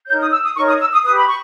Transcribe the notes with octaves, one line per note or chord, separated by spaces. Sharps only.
D#4 A#4 C#5 G6
D#6
E6
D#6
D#4 A#4 C#5 C#6
D#6
E6
D#6
G4 B4 D#6
B5
C#6